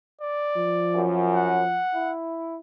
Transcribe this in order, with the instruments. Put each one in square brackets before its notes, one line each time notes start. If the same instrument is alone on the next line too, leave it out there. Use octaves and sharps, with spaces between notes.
[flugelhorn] D5
[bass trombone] F3
[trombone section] F#2
[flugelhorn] F#5
[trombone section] E4